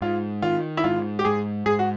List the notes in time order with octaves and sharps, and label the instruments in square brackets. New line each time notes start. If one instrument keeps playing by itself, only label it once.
[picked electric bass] G#2 [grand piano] F4
[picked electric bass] D#3 [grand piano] F4
[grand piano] E4
[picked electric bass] G#2 [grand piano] F4
[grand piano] G4
[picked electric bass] G#2 [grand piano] G#4
[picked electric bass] G#2 [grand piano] G#4
[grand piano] F#4